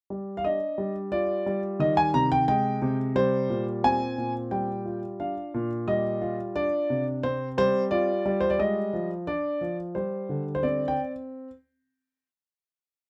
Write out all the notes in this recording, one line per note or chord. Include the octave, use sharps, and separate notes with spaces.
G3
F5
D4 D#5
G3
F4 D5
G3
D#3 D#5
G#5
C3 A#5
G5
G#3 G5
C3
G3 C5
A#2
C4 G#5
A#2
G3 G5
F4
D4 F5
A#2
G3 D#5
F4
D4 D5
C3
C4 C5
G3 C5
F4 D5
G3
C5
D5
G#3 D#5
F3
D4 D5
F3
G3 C5
D3
C5
C4 D5
G5